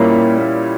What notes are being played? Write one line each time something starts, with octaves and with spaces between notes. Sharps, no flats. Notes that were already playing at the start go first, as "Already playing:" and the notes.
Already playing: A#2 G3 A#3 C#4 E4